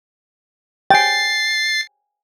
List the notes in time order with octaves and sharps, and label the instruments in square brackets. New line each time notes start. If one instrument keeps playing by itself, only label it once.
[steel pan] G5 G#5 [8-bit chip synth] A6 C7